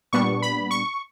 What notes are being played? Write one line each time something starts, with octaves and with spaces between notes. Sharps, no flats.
A#2 G3 B3 D4 C#6
B5
C#6